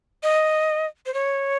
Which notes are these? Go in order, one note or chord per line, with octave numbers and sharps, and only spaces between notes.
D#5
C5
C#5